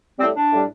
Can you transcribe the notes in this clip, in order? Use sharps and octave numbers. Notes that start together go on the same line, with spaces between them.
A2 G3 C4
D4
A2 G3